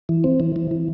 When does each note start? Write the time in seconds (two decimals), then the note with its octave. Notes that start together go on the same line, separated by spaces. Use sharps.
0.09 E3
0.24 C4
0.40 E3
0.56 E3
0.71 E3